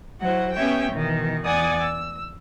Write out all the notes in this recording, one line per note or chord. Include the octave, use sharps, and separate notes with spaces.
F#3 E4 F#4 C5 F#5
B3 C#4 G4 C#5 E5 G5
B2 D#3 E3
E2 D5 F#5 G#5 D#6 A6
E6